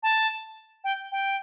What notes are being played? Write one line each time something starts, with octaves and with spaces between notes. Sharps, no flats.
A5
G5
G5